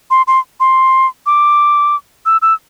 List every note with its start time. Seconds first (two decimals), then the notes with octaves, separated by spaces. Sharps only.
0.11 C6
0.28 C6
0.60 C6
1.26 D6
2.26 E6
2.42 E6